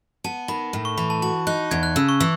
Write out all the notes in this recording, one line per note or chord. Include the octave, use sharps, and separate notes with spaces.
B3 A5
D#3 B5
A2
C#6
E3 B5
A5
F#4 A5
D#4 F#6
E2 G#6
F#6
C#3 E6
C#6
E3 E6